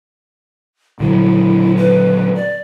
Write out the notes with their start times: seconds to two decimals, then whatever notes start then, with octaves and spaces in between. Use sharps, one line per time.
1.00 A#2 D3 F#3 E4
1.76 B4
2.35 D5